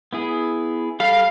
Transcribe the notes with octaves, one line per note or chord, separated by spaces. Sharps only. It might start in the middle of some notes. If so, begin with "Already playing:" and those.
B3 E4 G#4
G3 A4 F5 B5